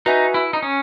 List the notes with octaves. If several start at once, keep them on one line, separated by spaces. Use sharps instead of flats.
D#4 F#4 B4 E5 G#5
E4
D#4
C#4